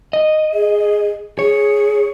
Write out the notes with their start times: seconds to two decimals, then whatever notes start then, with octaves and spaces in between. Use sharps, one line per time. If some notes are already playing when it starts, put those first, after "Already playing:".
0.13 D#5
0.53 G#4
1.39 G#4 C#5